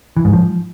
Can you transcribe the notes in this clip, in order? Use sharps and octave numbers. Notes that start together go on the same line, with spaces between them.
E3
G#2
F3